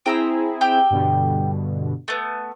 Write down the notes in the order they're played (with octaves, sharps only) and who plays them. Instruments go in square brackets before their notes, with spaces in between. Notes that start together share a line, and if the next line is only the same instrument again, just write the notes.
[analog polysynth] C4 E4 G#4 [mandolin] G5 A#5 E6
[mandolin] G4 G5 E6
[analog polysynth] G2 B2 D3
[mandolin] A3 B3